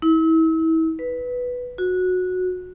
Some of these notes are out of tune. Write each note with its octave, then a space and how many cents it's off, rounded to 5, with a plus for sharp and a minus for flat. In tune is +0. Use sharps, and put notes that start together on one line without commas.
E4 -35
B4 +0
F#4 -15